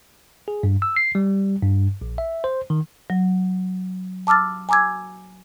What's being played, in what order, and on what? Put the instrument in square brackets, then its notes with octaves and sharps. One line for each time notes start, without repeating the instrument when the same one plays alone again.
[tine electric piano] G#4
G2
E6
C7
G3
G2
A#1
E5
C5
D#3
[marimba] F#3
A5 D6 E6 F6 A6
G#5 A#5 D6 E6 G#6